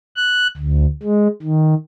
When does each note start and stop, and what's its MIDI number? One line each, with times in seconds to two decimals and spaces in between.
0.16 0.47 90
0.57 0.85 38
1.03 1.28 56
1.43 1.74 51